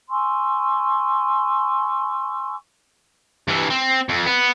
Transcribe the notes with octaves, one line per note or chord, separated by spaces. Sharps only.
G#5 C6 C#6 E6
G2 E3
C4
F2
B3